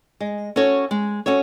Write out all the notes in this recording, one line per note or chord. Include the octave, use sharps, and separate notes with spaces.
G#3
C#4 F#4 A4 C#5
G#3
C#4 F#4 A4 C#5